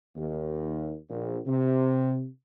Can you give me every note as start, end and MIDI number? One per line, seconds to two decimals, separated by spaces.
0.16 0.95 39
1.09 1.38 34
1.47 2.27 48